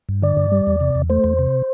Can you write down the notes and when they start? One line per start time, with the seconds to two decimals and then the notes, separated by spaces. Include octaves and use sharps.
0.09 G2
0.22 D3 D5
0.37 G2
0.52 G3
0.67 E2
0.80 C3
0.95 E2
1.10 A3 C5
1.24 E2
1.39 C3